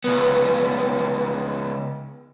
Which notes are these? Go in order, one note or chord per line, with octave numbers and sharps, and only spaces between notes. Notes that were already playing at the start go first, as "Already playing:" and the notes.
C#2 B3